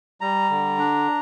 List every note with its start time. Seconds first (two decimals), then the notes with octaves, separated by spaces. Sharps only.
0.21 G3 A#5
0.50 D3
0.79 D4